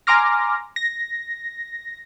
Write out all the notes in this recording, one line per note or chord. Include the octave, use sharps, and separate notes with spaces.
G#5 A#5 C6 D6 F6 A#6
A#6